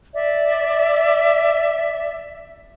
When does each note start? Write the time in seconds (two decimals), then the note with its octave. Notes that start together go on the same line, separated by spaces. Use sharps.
0.14 D5 E5